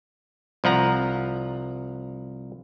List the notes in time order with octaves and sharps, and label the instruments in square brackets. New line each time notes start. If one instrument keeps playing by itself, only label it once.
[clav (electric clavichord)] C2 F3 F#5 A#5